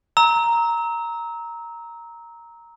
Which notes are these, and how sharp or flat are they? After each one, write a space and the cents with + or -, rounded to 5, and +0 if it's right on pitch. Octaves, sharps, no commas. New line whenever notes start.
A#5 +0 E6 -30